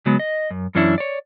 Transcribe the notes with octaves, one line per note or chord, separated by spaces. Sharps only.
C#3 F#3 G#3 B3
D#5
F#2
F#2 E3 C#4 D4 E4
C#5 D5